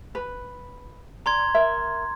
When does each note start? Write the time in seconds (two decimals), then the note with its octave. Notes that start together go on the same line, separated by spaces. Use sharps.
0.15 B4
1.26 D5 A#5 C6 G#6
1.55 A#4 E5